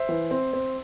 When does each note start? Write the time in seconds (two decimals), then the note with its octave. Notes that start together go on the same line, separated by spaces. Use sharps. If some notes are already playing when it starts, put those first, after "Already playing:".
Already playing: C5 E5
0.09 E3
0.31 C4
0.53 C4